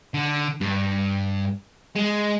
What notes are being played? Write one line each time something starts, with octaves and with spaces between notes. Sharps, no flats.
D3
G2
G#3